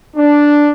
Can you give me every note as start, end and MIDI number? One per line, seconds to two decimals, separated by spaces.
0.16 0.71 62